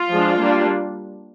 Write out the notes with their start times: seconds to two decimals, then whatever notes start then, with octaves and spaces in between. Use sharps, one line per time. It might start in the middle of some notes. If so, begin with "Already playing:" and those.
Already playing: F4
0.12 F3 G#3 D4
0.40 G3 A#3 D4